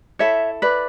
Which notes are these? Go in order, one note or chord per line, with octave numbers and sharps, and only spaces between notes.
E4 A4 C#5 E5
B4 D5